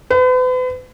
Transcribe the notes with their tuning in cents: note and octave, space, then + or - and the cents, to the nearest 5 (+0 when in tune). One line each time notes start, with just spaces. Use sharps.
B4 +40